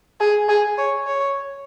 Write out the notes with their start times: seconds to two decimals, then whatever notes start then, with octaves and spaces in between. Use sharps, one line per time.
0.20 G#4
0.49 G#4
0.78 C#5
1.06 C#5